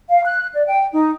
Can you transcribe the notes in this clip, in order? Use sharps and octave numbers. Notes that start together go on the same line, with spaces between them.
F5
F#6
D5
G5
D#4